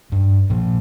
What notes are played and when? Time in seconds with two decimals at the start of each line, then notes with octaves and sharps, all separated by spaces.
0.12 G2
0.50 A#2 F3